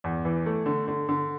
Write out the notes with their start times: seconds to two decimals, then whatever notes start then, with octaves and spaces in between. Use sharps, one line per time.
0.04 E2
0.25 E3
0.46 A3
0.66 D3
0.88 D3
1.09 D3